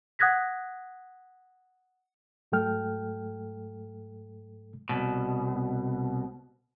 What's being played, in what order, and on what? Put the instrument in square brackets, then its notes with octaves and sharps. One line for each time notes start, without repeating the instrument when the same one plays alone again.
[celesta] F#5 D#6 F#6 G#6 A#6 B6
[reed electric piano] G#2 F#3 A3 A4 G5 F6
[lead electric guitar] C2 B2